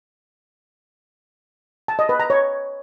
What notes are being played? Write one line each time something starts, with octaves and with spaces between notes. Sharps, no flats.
A5
D#5
B4
A#5
C#5